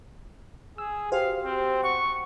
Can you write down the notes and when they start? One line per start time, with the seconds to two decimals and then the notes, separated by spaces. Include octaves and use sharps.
0.78 G#4 E6
1.12 F#4 G4 C5 F5
1.45 C4
1.83 F#5 C#6